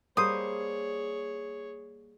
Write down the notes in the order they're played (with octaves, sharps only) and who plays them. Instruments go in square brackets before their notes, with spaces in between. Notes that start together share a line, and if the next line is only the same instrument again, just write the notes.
[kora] G3 A#3 C5 [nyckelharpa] G#4 C#5 [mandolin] D#6